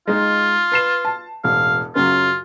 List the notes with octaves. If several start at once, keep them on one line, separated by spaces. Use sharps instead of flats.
G#3 D#4 F4
B4 C7 E7
A5
E1 A1 F5
F#2 C#3 F#3 F4